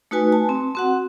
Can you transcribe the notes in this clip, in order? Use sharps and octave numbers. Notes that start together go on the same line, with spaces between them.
A3 D#4 F#4 B4 G#5
A5
C4
C4 F#4 F#5